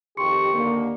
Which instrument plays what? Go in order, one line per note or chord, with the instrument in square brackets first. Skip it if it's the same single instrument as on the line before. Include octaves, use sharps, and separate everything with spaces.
[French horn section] F2 D#3 G4 [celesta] C6 C#6 C#7
[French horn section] D#2 D3 A#3